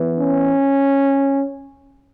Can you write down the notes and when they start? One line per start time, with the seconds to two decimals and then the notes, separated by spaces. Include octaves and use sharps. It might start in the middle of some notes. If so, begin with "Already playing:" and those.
Already playing: E3 B3
0.19 C#4